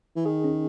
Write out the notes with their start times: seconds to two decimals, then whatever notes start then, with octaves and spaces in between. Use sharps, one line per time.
0.16 E3
0.26 D#3 G#4
0.44 C#4